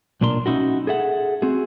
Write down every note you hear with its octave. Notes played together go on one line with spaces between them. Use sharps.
B1 A#2 D4 A#4 C6
C#4 D#4 E4 F#4
G#4 A4 E5 F#5
C4 F#4 G#4